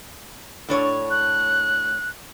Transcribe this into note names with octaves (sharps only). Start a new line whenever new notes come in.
A2 D4 C#5
F#6